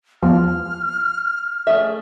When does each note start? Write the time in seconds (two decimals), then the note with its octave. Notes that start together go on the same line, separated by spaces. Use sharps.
0.22 E2 F3 F6
1.67 A3 G#4 E5